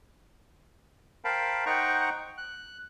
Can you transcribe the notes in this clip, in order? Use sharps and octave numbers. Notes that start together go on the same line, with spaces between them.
A#4 C5 F5 G5 A5 B5
D#4 C5 F#5 G5 A#5 C#6
F#6